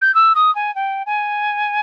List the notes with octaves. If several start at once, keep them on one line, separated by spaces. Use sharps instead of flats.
G6
E6
D#6
G#5
G5
G#5